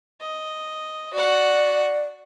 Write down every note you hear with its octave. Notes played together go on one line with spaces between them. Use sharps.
D#5
F#4 D5 F#5